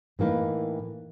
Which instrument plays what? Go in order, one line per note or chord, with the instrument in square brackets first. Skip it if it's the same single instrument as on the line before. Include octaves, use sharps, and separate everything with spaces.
[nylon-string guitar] A2 E3 A#3 D#4 B4